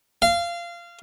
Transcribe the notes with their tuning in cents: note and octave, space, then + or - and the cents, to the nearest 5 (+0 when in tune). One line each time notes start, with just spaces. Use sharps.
F5 -20